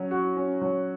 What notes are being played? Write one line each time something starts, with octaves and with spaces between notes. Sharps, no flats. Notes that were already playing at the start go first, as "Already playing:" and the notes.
Already playing: F#3 C#4
F#4
C#4
F#3